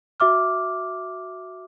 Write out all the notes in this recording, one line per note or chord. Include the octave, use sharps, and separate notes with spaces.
F#4 E5 D6 F6